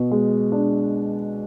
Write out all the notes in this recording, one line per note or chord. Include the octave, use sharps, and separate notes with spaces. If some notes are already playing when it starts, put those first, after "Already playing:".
Already playing: B2
G#3
D4